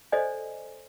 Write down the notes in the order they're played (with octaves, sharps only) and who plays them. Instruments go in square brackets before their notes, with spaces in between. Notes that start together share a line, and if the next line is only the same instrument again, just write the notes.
[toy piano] A4 C5 D5 D#5 G#5